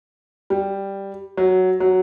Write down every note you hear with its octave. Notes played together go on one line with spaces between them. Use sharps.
G3
F#3
F#3